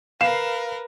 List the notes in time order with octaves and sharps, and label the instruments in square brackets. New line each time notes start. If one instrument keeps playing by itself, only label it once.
[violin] A#4 B4 [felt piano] F5 C7 E7